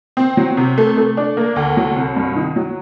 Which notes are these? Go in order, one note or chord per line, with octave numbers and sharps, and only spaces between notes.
C4
F#3
C3
A3
A3
D4
A#3
D2
F#3
C2
G2
D#3
F#3